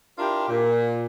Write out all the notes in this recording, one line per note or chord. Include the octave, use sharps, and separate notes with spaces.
D4 E4 F4 G4 A#4
A#2